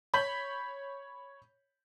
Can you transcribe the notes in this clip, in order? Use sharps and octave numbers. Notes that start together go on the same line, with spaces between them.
C#5 B5 G6 B6 F#7